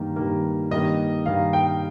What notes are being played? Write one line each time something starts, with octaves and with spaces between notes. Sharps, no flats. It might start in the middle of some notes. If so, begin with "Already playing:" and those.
Already playing: G2 D#3 A#3
G2 D#3 A#3
G2 D#3 A#3 D#5
G2 D#3 A#3 F5
G5